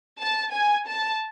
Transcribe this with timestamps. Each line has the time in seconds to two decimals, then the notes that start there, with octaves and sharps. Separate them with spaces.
0.19 A5
0.52 G#5
0.86 A5